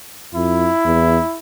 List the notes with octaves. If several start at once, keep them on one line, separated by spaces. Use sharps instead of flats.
F2 E4
E2